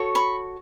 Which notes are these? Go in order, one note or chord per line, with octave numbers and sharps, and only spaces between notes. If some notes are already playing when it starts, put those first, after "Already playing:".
Already playing: F#4 A4 C#5
B5 C#6